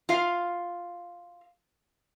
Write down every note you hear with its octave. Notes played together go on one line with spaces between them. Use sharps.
F4 F5